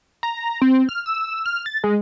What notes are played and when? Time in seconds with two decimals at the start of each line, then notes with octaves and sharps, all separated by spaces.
0.23 A#5
0.62 C4
0.89 F6
1.06 E6
1.46 F6
1.66 A6
1.84 G#3